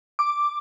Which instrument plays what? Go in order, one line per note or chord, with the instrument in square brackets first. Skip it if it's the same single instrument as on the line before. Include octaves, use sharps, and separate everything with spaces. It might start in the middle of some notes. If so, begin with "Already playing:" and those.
[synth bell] D6